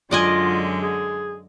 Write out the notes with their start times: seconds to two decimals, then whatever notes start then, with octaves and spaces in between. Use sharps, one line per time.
0.11 F#2 D3 G#3 F4 D5 D#5 G#5
0.83 G#4